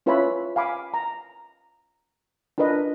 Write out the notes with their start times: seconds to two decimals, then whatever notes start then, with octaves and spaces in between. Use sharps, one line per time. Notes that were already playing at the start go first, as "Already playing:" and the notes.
0.06 C#4 F4 B4 C#5 E5 B5
0.56 F5 G#5 B5 D6
0.94 A#5
2.58 D4 F4 A#4 B4 D#5